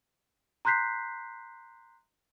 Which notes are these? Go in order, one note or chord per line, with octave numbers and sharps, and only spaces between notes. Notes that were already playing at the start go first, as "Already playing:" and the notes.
A#5 C6 F#6 G6 B6 C7